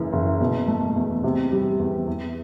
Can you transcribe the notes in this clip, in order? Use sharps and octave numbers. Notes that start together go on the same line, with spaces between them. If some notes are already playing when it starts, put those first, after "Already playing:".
Already playing: F#1 F#2 E3
F#1
B2
A3
E2
C3
G3
E2
E2